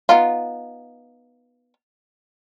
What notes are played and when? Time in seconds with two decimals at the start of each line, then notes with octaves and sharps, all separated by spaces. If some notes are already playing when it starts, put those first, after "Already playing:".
0.09 B3 D#4 F4